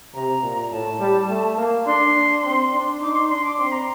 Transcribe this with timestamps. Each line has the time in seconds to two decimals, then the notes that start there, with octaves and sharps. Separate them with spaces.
0.14 C3 A#5
0.42 A#2
0.71 A2 A5
0.99 G3
1.29 A3
1.57 A#3
1.86 D4 C6
2.15 D4
2.43 C4
2.72 D4
3.00 D#4 D6
3.15 C6
3.29 D4 C6
3.44 D6
3.58 C4 C6
3.72 A#5